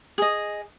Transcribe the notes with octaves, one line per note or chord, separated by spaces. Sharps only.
G#4 D#5